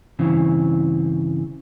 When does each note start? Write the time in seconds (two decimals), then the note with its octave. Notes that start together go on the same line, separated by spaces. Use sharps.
0.19 G2 C#3 E3 C4